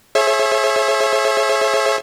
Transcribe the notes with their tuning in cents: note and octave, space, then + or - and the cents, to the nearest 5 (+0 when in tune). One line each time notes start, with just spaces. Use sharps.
G#4 +35 C#5 -40 E5 +5